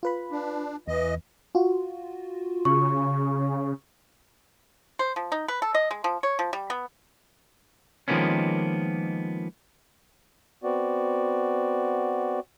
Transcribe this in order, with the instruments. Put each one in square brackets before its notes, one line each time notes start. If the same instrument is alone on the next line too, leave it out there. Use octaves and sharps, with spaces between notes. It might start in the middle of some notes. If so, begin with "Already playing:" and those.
[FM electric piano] F4 B4 B5
[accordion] D4
[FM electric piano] E2 [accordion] E3 D#5
[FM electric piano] F4 F#4
[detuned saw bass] C#3 [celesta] C#6
[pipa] C5
F3
D#4
B4
A4
D#5
G#3
F3
C#5
F3
G3
B3
[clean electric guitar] D#3 F3 G#3 A#3 B3 C#4
[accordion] B3 C4 F#4 D5